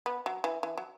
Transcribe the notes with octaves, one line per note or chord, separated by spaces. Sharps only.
B3
F#3
E3
E3
F#3